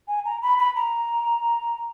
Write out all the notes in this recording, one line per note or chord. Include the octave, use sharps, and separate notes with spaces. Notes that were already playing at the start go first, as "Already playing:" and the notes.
G#5
A#5
B5
B5
A#5